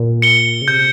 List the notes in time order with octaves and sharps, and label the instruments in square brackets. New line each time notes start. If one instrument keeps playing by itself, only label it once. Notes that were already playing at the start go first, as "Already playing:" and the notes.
Already playing: [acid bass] A#2
[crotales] C#7 G7
[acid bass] C#3
[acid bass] C3 [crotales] G6